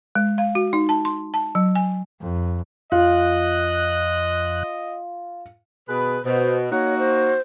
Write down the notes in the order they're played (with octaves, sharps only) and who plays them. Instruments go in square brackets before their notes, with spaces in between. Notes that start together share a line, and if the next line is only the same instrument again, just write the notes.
[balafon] G#3
F5
F#4
D#4
A5
C6
A5
F#3
G#5
[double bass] F2
[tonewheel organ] F2 F#6 [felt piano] F4 [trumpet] D#5
[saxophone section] B2 G#4 B4
[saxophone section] B2 [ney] C5
[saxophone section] A#3 D#4 F#4 [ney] C#5
[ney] C5